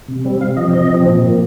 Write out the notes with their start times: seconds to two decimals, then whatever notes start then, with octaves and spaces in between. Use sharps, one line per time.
0.08 C3
0.25 G3 C4
0.41 C3 F5
0.57 F3 C4 D#5
0.73 C3 D#5
0.89 F3 C4
1.06 A#2
1.22 F3 A#3